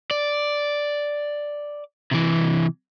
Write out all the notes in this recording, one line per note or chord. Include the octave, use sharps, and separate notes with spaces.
D5
C3 E3